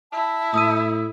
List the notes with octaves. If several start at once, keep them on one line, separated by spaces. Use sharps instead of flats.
E4 A5
A2 D#6 E6 D#7